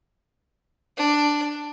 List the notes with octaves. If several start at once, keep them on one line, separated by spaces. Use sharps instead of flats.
D4